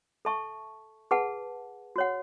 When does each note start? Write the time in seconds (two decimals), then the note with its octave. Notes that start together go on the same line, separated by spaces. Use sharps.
0.25 A4 E5 A5 C#6
1.11 G#4 B4 F#5 A5
1.96 F#4 C#5 F#5